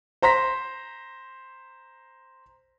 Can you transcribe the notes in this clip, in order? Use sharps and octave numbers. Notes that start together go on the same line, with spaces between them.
C5 A#5 C6 A#6 B6